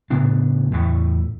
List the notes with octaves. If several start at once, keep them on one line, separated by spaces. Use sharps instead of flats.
A2 C#3 B3 D4
E2 A2 A3